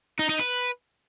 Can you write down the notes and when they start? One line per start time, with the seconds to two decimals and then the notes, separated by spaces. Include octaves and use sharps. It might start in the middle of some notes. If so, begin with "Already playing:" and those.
0.19 D#4
0.29 D#4
0.40 B4